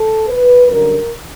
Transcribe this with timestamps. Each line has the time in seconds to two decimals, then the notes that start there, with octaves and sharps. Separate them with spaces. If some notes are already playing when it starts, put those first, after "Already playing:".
Already playing: A4
0.28 B4
0.68 F#2 D3 G3 A#4